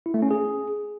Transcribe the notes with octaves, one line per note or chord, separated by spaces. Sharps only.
E4
A3
C#4
G#4